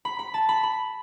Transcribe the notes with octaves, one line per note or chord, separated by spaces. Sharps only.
B5
B5
A5
B5
B5